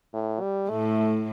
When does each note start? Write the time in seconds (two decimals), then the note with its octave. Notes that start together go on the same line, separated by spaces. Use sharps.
0.14 A2
0.41 G3
0.69 A2 A3